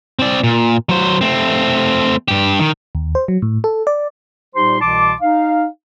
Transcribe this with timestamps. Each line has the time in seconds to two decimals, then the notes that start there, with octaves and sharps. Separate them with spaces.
0.19 C4 D5
0.44 A#2
0.89 F#3 C5
1.21 A3 C4
2.28 G2 G4
2.60 D#3
2.95 D#2
3.15 C5
3.28 F#3
3.42 A2
3.64 A4
3.87 D5
4.55 A#2 G3 D#4 G4 C5 C6
4.81 C2 B2 E3 A5 C6 D6
5.20 D#4 F5